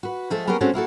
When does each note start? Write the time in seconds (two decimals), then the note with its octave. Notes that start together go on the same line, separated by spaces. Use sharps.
0.03 F#4 B4
0.30 F3 G#3 A3 G#4 A4 D#5
0.47 B3 C#4 G4 G#4 A#4 C#5
0.61 G#3 A3 C4 C#4 F#4 A4
0.74 A#3 E4 F#4 A4